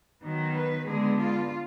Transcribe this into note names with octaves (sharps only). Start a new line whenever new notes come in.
D#3 F#3 B3
B4
D3 G#3 B3 G#4
F4